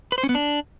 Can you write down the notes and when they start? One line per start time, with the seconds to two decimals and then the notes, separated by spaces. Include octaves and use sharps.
0.12 B4
0.18 C5
0.23 C#4
0.29 B3
0.35 D4